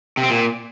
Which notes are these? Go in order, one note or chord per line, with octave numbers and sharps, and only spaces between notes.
C3
C4
A#2